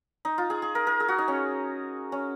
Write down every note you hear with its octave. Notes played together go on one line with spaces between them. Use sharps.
D#4
F4
G#4
G#4
A#4
A#4
G#4
F#4
D#4
C#4
C#4